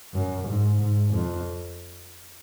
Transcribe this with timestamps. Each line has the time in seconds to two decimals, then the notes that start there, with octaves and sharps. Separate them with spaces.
0.14 F#2
0.47 G#2
0.81 G#2
1.13 F2